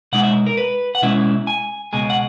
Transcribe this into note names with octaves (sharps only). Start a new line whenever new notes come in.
B2 G#3 D#4 F#5
E5
A#4
B4
F#5
B2 G#3 C#4 E4 E5
G#5
C#2 B2 G#3 G#5
F#5